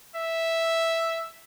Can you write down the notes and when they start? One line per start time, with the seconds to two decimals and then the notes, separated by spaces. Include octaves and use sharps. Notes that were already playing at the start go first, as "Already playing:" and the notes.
0.16 E5